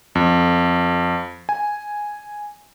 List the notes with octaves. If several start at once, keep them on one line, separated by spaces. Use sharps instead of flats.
F2
G#5